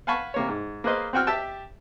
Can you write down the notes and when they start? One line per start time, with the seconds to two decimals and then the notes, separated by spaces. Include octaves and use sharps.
0.07 F5 F#5 G#5 A5 B5 C#6
0.34 C3 A#3 C#5
0.48 G#2
0.84 A#3 G#4 B4 C5 D#5 F5
1.13 C4 F#4 G5 F6
1.27 G4 E5 G5 A5